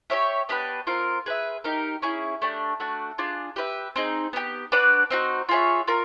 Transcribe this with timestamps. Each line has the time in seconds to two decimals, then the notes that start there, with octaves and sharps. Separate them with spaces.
0.10 G4 A#4 C#5 E5
0.49 B3 D4 G4 B4
0.87 C4 F4 A#4
1.26 G#4 B4 E5
1.64 D#4 G4 A#4
2.02 C#4 E4 G#4
2.42 A3 D4 G4
2.80 A3 D4 F#4
3.18 D4 F4 G#4
3.56 G4 B4 E5
3.96 C4 D#4 G#4
4.33 B3 D4 G4
4.72 D4 F#4 B4 D5
5.11 C4 D#4 F#4
5.49 F4 G#4 C#5 E5
5.87 F4 A#4